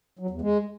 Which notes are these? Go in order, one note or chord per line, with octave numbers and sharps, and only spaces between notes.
F#3
E2
G#3